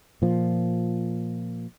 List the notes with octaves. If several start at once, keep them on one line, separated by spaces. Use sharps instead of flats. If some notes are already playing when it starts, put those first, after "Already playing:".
A#2 F3